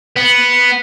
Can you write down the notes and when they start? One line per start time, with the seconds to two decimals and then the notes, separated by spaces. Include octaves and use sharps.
0.16 B3